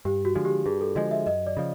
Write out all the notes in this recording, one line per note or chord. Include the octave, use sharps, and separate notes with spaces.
G2 G4
F#4
D3 F3 G#3
G4
G2 G#4
A4
D3 F3 G#3 D#5
E5
F#2 D#5
D5
C#3 F3